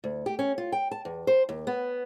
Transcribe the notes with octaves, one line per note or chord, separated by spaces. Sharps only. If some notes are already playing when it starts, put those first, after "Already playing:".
D2
G4
C#4
F4
G5
A5
E2
C5
D#2
B3